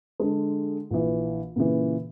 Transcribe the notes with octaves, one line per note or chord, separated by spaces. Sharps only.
D3 G#3
A#1 E3
A#2 C#3 E3